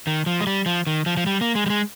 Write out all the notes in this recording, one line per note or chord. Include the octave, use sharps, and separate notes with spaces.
D#3
F3
G#3
G3
F3
D#3
F3
F3
G3
A#3
G#3
G3
G#3